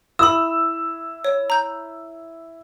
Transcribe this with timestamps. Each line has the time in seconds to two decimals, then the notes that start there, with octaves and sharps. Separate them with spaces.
0.19 E4 B5 D#6 E6
1.25 C#5
1.50 A#5 G6